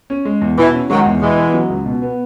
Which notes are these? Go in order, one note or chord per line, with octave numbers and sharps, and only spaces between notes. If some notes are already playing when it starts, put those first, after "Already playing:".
C#4
G#3
E2
B2 E3
C#4
D#3 F#3 G#3
E2
B2 E3 G#3
B3
F#3
C#2
B2
B3